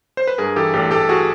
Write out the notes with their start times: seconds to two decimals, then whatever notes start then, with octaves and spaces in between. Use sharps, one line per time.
0.17 C5
0.27 B4
0.38 G2 G#4 A#4
0.56 E3 G4 A4
0.74 A1 G4 A4
0.91 A1 G4 A4
1.09 F#4 G#4